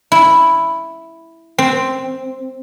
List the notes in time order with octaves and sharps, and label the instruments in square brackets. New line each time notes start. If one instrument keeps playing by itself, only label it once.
[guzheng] E4
C4